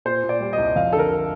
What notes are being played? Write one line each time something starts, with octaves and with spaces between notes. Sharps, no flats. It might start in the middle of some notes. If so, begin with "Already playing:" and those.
A#2 C5
A#2
D5
G3
C2 D#5
F2 F5
D3 A4
A#4